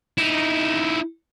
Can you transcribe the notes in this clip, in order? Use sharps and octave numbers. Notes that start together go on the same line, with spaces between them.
D#4 E4